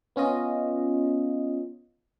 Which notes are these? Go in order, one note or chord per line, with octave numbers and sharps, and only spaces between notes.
B3 C#4 F4 D#5